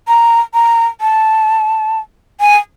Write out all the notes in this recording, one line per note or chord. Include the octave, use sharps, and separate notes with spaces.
A#5
A#5
A5
G#5